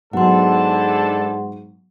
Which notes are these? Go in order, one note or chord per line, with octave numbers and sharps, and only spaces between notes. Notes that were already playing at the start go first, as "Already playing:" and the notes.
E2 G#2 F#3 B3 D4 A4 F#5 C6